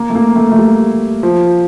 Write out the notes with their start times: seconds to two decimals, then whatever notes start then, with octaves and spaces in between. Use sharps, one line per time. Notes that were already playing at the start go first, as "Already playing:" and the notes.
Already playing: A#3
0.10 A3
0.15 A#3
0.36 A3
0.52 A3
0.58 G3
1.23 F3